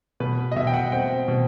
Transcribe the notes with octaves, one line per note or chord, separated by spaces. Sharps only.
B2 B4
D#5
B2 E5
G5
F#5
C4 G5
B2